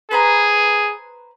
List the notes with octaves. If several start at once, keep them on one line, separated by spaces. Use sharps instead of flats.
G#4 B4 C5 A#5